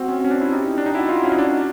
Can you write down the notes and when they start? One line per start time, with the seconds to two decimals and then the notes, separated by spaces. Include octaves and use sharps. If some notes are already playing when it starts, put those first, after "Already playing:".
Already playing: C4 F#4
0.08 C#4
0.24 C#4
0.30 D4
0.41 E4
0.52 D#4 G4
0.78 D4
0.86 D#4
0.95 E4 F#4
1.09 F4
1.24 C#4
1.32 D#4
1.38 D4